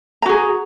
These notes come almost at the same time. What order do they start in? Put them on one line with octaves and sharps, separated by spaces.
A#5 F#4 G#4